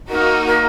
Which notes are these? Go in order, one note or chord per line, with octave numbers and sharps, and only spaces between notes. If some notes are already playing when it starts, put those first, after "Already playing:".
A#3 D#4 F#4 A#4
A#4